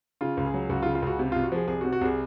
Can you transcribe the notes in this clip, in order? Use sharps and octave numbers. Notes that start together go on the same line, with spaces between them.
C#3 F4
C#2
G#4
F#3
C#2 F#4
F4
C#3
F4
C#2 F#4
C3
C2 F4
F#4
F3 G#4
C2 G#4
F#4
C3
F#4
C2 G#4